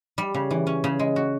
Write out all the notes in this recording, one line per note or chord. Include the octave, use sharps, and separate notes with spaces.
G3
C#3
E3
C#4
C#3
G#3
F#4